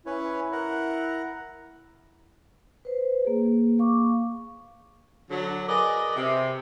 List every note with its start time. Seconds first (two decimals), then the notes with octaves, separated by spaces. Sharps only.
0.06 C#4 E4 B4 C#5
0.52 A#4 F#5
2.85 B4 C5
3.25 A#3 G#4
3.79 A#3 F5 C#6 D6
5.31 D3 F#3
5.69 G#4 A#4 B4 D5 D#5
6.16 C3